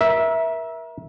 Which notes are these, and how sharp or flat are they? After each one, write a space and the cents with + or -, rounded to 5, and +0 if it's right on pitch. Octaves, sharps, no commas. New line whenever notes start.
A#4 +35 E5 -10